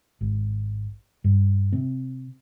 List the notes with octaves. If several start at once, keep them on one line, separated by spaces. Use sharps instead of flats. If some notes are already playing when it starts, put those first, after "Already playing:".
G#1
G2
C3 C4